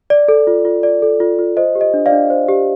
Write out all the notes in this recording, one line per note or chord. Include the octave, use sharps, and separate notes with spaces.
D5
A4
F4
F4
D5
A4
F4
F4
C5 D#5
G4
D#5
D4
D5 F5
D4
C5
G4